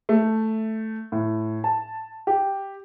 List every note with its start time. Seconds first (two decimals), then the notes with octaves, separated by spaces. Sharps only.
0.09 A3
1.12 A2
1.64 A5
2.27 G4